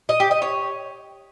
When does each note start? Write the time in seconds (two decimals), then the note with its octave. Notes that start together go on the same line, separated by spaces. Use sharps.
0.09 D#5
0.20 G4
0.31 D#5
0.42 C#5